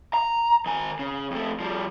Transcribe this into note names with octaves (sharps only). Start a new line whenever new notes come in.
A#5
D#3 G#5
C#3
F2 A3
F3 G3